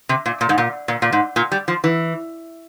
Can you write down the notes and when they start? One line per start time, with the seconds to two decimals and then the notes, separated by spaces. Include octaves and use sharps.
0.09 C3
0.26 A#2
0.41 A#2
0.49 G#2
0.58 A#2
0.88 A#2
1.02 A#2
1.12 G#2
1.36 A#2
1.52 G3
1.68 F3
1.84 E3